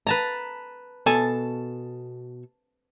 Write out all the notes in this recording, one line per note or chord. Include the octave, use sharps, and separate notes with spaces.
B4 A5 A#5
B2 A4 G#5 A5